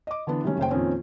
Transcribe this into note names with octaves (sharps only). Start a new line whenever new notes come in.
D#5 D6
D3 E3 B3 D4
C3 D#3 F#3 G3 A3 C#4
F#1 C#3 C5 G5
F2 A#2 D#3 C4 C#4